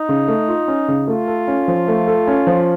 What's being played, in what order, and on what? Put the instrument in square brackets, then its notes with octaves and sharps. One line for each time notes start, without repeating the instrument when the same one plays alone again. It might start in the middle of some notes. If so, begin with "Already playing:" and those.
Already playing: [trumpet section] D#4
[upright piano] C#3
A3
F4
C#4
C#3
[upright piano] A3 [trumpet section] F4
[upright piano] A4
C#4
F3
A3
A4
C#4
F3